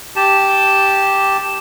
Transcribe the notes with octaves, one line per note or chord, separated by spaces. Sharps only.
G4 A5